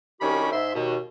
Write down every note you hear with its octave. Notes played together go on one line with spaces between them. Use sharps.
C2 D#3 C#4 F#4 G4 B5
G#2 E5 C6
D#2 B2